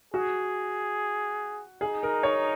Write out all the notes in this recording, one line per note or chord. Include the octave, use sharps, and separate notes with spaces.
F#4 G#4
D#4 G#4
A#4
C#5